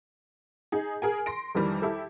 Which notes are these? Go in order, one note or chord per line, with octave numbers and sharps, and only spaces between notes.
D#4 G#4
G#4 A#4 G#5
C6 A#6 D7
F2 D#3 E3 G3
E4 G4 A4